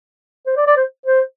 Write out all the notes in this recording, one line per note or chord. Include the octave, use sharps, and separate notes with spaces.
C5
D5
D5
C5
C5